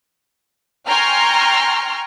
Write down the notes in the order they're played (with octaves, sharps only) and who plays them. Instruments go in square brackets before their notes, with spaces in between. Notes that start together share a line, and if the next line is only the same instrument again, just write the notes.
[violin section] G5 G#5 A#5 C6 C#6 F6